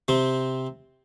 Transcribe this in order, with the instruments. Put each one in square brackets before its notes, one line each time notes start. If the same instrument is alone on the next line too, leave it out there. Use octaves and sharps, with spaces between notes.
[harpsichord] C3 C4